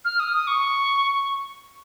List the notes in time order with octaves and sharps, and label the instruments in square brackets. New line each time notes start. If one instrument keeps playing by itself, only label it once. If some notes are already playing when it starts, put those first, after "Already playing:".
[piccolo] F6
D#6
D#6
C#6